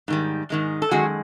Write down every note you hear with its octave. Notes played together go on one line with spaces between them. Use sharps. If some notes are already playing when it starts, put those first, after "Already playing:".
G#2 D#3 G3
G#2 D#3 G#3
A4
F#2 D#3 G#3 F#4 G#4